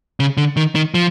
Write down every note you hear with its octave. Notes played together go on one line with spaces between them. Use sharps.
C#3
D3
D#3
D#3
F3